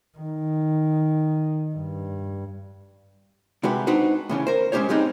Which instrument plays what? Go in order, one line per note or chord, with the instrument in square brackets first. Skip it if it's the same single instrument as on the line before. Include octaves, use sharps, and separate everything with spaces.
[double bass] D#3
G2
[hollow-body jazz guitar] C3 G#3 F#4 G4 B4 B5
D4 D#4 F#4 B4 C5
A2 C#3 E3 C#4
A#4 C5
G#3 C#4 F4 G4 C5 C#5
G#2 G3 G#3 C4 D#4